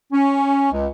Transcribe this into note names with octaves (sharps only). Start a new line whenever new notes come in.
C#4
C#2